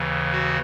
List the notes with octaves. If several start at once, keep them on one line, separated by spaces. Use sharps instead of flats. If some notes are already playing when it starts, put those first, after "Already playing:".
Already playing: D#2 C#3 E3
F#4